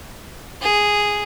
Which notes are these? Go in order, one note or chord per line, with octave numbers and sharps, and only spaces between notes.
G#4